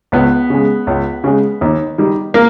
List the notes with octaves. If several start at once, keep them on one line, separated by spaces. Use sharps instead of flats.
C#2 B3
C#3 G#3
C#2
C#3 G#3
D#2
D#3 G3
A#3